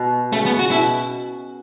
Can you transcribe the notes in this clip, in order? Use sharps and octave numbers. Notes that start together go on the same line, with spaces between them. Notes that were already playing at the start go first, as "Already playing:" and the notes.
Already playing: B2
C#3 A3
B3
F#4
B2 E4